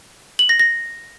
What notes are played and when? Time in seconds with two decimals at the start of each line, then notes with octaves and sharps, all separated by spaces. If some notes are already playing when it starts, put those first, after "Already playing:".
0.39 F#7
0.49 A#6
0.60 A#6